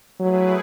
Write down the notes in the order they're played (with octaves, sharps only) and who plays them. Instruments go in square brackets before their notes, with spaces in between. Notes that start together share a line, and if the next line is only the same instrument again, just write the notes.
[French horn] F#3 [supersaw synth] A3 E4 G#4 B4